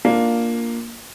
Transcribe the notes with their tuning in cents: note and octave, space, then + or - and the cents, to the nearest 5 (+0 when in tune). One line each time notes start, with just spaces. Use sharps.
A#3 +0 D4 +0 F4 +0